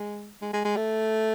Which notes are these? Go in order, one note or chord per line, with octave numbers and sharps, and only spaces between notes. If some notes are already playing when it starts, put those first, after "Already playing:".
Already playing: G#3
G#3
G#3
G#3
A3